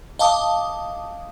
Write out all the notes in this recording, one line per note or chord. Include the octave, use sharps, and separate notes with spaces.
D#5 F5 A5 D6 D#6